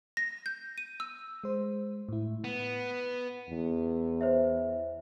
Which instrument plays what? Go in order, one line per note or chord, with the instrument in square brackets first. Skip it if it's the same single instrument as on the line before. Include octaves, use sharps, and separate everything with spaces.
[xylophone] A#6
G6
D#7
E6
[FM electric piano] G#3 C5
A2 E4
[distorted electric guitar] B3
[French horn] E2
[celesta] C5 C#5 E5